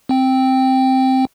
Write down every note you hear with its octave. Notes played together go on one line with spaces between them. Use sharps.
C4 G5